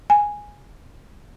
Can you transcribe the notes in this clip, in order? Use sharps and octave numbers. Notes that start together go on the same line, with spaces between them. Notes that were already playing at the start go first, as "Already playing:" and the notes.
G#5